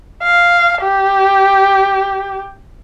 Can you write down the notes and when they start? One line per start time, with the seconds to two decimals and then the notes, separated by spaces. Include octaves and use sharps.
0.22 F5
0.82 G4